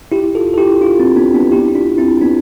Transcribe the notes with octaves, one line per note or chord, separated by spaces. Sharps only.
E4 G4
F4 A4
A4
E4 G4
D4 F4
C4
B3 D4
B3 D4
E4 G4
E4
D4 F4
C4 E4
B3 D4